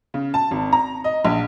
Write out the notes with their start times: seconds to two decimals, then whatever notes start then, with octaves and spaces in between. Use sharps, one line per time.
0.14 C#3
0.34 A5
0.51 G#1
0.73 A#5
1.04 D#5
1.25 A#1